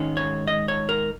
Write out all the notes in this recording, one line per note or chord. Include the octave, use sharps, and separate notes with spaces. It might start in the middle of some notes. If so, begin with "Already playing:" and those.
Already playing: G#2 D#3 G#3 C#4
C#5
D#5
C#5
A#4